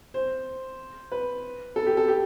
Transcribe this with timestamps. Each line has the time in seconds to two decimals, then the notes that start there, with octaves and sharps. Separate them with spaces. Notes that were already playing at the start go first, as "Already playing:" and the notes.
0.14 C5
1.12 B4
1.76 A4
1.87 G4
1.97 A4
2.08 G4